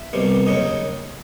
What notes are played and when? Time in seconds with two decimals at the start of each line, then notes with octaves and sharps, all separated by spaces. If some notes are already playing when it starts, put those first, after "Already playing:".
Already playing: E5
0.13 C2 B2 G3
0.47 D#2 C#3 F#3 D#5